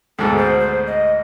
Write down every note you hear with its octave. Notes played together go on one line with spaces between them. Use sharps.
D2 G#2 B2 A4
C5
C5
D#5